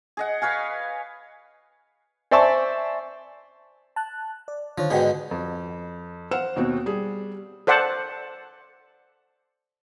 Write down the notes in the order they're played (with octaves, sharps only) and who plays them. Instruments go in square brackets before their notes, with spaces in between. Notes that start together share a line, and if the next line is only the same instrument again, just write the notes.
[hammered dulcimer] G#4 D#5 F#5
B4 C#5 F5 G#5
[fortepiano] C5 D5 E5 G#5 A5 C#6
[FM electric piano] A5 F#6
D5
[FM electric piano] D3 D#3 C#5 [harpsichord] F3
[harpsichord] G#2 B2 D3 [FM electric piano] F#4 G5 G#5
[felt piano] F2
C5 F#5 E6 F6 E7
D#2 B2 C4 F#4
G3 G#4
[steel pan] A4 C5 D5 F#5 A5